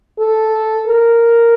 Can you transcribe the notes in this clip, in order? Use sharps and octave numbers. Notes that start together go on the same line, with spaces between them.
A4
A#4